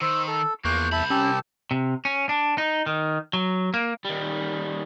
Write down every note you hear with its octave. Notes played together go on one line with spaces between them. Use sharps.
D#3 C5 E6
A4 E6
E2 F3 A#3 C#6 F#6 G6
C2 E5 A5 B5
C#4 G4 A5 E6
C3
C#4
D4
D#4
D#3
F#3
A#3
D#3 G3